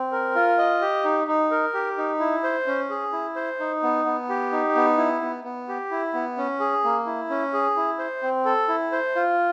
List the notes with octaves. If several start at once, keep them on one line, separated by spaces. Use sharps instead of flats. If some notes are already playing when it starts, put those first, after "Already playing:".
Already playing: C4
A#4
F4
D#5
G4
D#4
D#4
A#4
G4
D#4
E4
C5
C#4
G#4
E4
C5
D#4
B3
B3
G4
D#4
B3
E4
B3
B3
G4
E4
B3
C#4
G#4
A#3
E4
C#4
G#4
E4
C5
C4
A4
E4
C5
F4